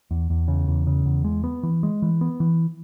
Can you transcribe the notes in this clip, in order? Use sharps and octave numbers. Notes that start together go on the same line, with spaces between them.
E2
E2
C#3
E2
C#3
E2
G#3
B3
E3
G#3
E3
B3
E3